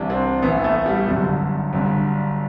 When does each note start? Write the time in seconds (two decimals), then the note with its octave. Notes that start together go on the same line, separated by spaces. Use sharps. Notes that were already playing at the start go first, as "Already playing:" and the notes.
Already playing: C2 C3 E3 D4
0.10 C4
0.42 A1 A2 E3 B3
0.64 A3
0.86 G3
1.08 G1 F#2 D3 F#3
1.73 G1 G2 D3